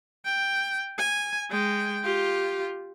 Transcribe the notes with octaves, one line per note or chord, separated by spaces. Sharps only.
G5
G#5
G#3 G5
F4 G4